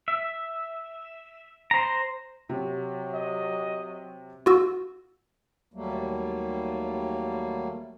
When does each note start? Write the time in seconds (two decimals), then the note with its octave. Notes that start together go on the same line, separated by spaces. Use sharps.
0.08 E5
1.71 C5 A#5
2.49 C3 F#3
3.14 D#5
4.46 F4 F#4 E6
5.74 D#2 F#3 G3 A3 A#3